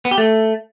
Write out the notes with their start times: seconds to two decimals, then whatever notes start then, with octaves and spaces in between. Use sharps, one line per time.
0.05 B3
0.11 G4
0.18 A3